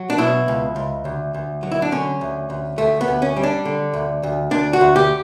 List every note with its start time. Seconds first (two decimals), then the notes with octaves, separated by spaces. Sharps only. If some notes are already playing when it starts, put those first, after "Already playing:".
Already playing: F#3
0.10 D4
0.18 B2 E4
0.48 C#2
0.76 C#2
1.05 D2
1.34 D2
1.63 F#3
1.72 E4
1.82 D4
1.91 D3 C#4
2.21 D2
2.50 D2
2.78 D2 A3
3.01 B3
3.08 D2
3.22 C#4
3.36 G3
3.43 D4
3.65 D3
3.94 D2
4.23 D2
4.51 D2 D4
4.73 F#4
4.81 D2
4.96 G4